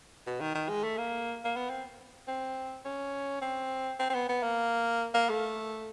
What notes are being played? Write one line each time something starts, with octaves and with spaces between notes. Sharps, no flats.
B2
D#3
D#3
G#3
A3
A#3
A#3
B3
C4
C4
C#4
C4
C4
C4
B3
B3
A#3
A#3
A3